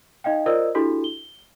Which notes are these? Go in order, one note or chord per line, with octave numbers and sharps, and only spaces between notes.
D#4 D#5 F5 G5
F4 A#4 C5 D5 D#5 E6
D4 E4 F#4 G4 A4
G7